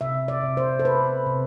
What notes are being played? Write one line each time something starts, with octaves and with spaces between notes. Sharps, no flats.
C3 E5
D5
C3
C5
A4
C3 B4
C3